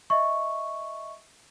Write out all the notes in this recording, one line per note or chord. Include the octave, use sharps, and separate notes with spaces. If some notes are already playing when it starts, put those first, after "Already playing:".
D#5 E5 C#6